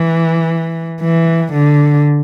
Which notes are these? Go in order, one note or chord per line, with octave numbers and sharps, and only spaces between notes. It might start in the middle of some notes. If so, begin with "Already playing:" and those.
Already playing: E3
E3
D3